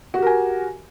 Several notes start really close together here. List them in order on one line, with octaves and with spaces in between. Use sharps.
F#4 G4 A#4 G#5